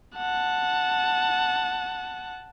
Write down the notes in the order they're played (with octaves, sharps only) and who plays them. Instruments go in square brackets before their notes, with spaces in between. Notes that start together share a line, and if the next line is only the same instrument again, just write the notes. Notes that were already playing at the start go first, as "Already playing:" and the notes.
[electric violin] F#5 A5